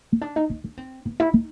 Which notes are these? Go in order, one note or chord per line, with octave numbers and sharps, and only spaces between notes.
C#4
D4
D#4
D#4
D4
C4
B3
E4
D#4